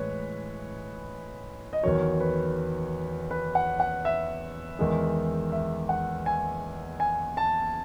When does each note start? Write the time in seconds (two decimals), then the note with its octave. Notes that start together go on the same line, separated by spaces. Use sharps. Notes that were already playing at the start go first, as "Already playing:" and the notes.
Already playing: A2 E3 G#3 B4 C#5
1.73 D#5
1.83 E2 D#3 F#3 C#5
2.20 B4
3.31 B4
3.55 F#5
3.80 F#5
4.05 E5
4.79 E2 D#3 G#3
5.52 E5
5.89 F#5
6.26 G#5
7.00 G#5
7.37 A5